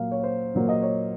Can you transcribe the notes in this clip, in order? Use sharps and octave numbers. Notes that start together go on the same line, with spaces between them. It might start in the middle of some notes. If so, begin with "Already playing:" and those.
Already playing: A#2 F#3 A#3 F5
C#5
C5
A#2 F#3 A#3 C#5
D#5
C#5